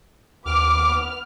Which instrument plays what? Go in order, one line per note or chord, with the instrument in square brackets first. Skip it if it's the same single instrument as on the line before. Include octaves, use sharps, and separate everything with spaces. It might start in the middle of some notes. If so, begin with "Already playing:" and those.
[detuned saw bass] D#2 [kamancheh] B3 F6 [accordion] D6